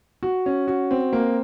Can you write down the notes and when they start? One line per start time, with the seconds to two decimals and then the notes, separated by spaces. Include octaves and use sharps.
0.23 F#4
0.46 C#4
0.68 F#4
0.91 C4
1.13 A#3